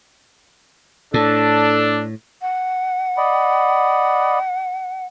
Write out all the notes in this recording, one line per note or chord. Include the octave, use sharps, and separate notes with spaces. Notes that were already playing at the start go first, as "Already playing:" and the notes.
A2 D4 A4
F#5
D5 D#5 B5